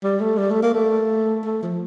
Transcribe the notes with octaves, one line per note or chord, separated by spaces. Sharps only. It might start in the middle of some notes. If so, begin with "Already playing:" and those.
G3
A3
G3
A3
A#3
A3
A3
F3